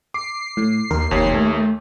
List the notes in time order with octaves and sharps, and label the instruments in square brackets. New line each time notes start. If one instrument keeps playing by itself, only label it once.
[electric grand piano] D6 [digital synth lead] C7
[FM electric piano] A2
[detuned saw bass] D#2 [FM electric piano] A#4
[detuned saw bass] F1 [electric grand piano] D#2 C#5
[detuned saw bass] A3